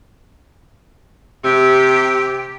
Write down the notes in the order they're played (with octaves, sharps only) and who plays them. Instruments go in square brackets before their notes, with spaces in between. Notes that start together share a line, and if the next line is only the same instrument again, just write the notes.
[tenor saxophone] C3 [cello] G4